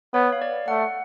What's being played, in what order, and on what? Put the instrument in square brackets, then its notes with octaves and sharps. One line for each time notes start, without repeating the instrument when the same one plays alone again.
[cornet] B3 [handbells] C#5
[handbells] F5
D5
[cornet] A3 [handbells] F#5